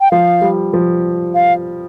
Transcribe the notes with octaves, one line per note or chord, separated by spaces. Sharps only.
G5
F3 F5
G3
F3
F5